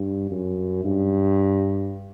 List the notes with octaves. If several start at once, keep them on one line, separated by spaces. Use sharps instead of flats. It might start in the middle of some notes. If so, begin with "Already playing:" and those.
Already playing: G2
F#2
G2